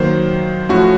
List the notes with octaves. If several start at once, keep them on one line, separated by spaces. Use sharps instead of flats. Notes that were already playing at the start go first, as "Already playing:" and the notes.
Already playing: D#3 F#3 A#3 C5
A2 F3 A3 C#4 F#4